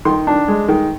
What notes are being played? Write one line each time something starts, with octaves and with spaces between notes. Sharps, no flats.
D#3 C6
D4
G#3
D#3